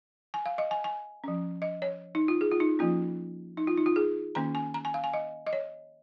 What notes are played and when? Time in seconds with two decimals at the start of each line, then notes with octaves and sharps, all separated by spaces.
0.34 G#5
0.46 F5
0.58 D#5
0.71 G#5
0.84 G#5
1.24 F3 C#4
1.62 D#5
1.82 C#5
2.15 D#4
2.28 F4
2.41 G#4
2.52 F4
2.60 D#4
2.79 F3 A#3 C#4 F4
3.57 D#4
3.67 F4
3.77 D#4
3.86 F4
3.96 G#4
4.35 D#3 A#3 C#4 A#5
4.55 G#5
4.74 A#5
4.85 G#5
4.94 F5
5.04 G#5
5.14 D#5
5.47 D#5
5.53 C#5